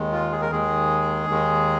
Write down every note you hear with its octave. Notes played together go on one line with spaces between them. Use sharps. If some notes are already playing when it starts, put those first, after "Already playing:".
Already playing: D#2 D#3 G#3
F4
G#4
A#4
D#2 D#3 G#3 G#4
D#2 D#3 G#3